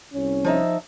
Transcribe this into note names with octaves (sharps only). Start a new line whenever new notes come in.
C2 C#4
F3 D#4 E5